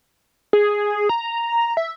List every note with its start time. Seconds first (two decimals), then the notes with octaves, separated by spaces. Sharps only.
0.53 G#4
1.09 A#5
1.77 E5